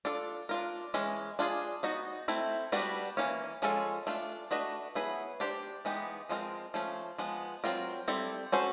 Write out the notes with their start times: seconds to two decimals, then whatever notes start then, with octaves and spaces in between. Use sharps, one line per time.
0.05 D4 F4 A4
0.49 D4 F4 A#4
0.94 E3 G#3 C#4
1.39 D4 F4 G#4
1.83 B3 D#4 F#4
2.28 A3 C4 E4
2.72 G3 B3 D4 F#4 B4
3.17 E3 G3 A#3 C#4
3.62 F3 G#3 C#4 F4 A4
4.07 A3 D4 F4
4.51 A3 D4 F#4 B4 D#5
4.95 F#3 B3 E4 G#4 B4
5.40 D4 G4 C5
5.85 E3 G#3 B3 D#4 G4
6.29 F3 G#3 C4 F4 A#4
6.74 F3 A3 C#4
7.18 F3 G#3 B3
7.64 F#3 A3 C4 F4 A#4
8.08 G3 C4 E4 A4
8.52 C#4 F#4 A4 C5